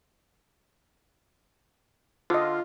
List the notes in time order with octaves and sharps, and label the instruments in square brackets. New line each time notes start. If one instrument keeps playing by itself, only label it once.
[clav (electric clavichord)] D3 [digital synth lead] F4 [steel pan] C5 D#5